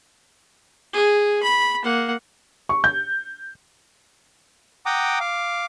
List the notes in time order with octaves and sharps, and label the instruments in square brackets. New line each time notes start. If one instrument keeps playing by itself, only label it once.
[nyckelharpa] G#4
B5
A#3 F#5
[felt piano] C#6
G6
[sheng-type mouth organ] F#5 G5 A#5 D6 D#6
F5 D6